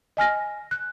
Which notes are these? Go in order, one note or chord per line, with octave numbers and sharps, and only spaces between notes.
D#5 G#5 F6 A#6
F#6